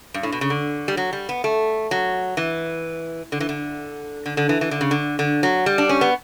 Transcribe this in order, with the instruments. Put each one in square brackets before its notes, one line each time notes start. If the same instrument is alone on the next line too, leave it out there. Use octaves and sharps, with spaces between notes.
[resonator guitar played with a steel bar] G2
A2
B2
C#3
D3
G3
F#3
G3
B3
A3
F#3
E3
D3
E3
D3
D3
D3
E3
E3
D3
C#3
D3
D3
F#3
G3
D4
C#4
B3